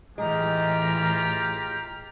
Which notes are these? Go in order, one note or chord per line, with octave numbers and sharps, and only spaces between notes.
A2 E3 G#3 F4 G4 A#5